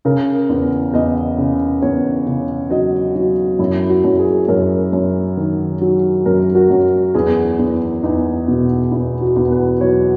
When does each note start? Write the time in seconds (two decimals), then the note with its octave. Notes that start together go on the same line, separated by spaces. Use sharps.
0.05 C#3 A#4
0.49 E2
0.94 E2 D#5
1.38 C#3
1.82 E2 C#5
2.26 C#3
2.70 F#3 D#5
3.15 F#3
3.59 F#2 E4
3.89 F#4
4.04 F#2
4.19 G#4
4.48 F#2 A#4
4.93 F#2
5.37 D#3
5.81 F#3
6.26 F#2 A#4
6.55 F#4
6.70 F#2
7.14 E2 G#4
7.59 E2
8.03 E2 D#4
8.48 B2
8.91 E2 E4
9.21 F#4
9.36 E2
9.51 B4
9.80 F#3 C#5